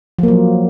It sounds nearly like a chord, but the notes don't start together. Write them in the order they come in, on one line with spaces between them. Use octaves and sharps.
F3 A#3 F#3